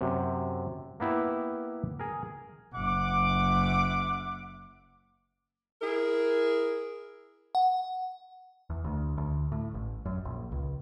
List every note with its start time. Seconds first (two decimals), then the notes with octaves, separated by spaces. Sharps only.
0.01 F#2 C3
1.00 A#3 B3 E4 G4
1.99 G#4 A#4
2.74 F#1 E5 F#5 D6
5.82 E4 G#4 A#4
7.55 F#5
8.70 E2
8.84 D2
9.18 D2
9.52 A2
9.74 A1
10.05 F#2
10.25 A#1
10.52 C#2